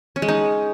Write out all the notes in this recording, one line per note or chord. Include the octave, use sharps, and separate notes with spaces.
C#4
G#3
D#4